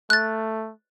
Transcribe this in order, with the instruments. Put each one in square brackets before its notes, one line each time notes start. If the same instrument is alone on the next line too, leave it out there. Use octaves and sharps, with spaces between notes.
[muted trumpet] A3 [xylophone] F#6 A6